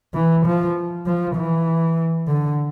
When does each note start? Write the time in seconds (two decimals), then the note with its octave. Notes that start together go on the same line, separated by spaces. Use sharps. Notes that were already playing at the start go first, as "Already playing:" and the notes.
0.14 E3
0.46 F3
1.06 F3
1.36 E3
2.28 D3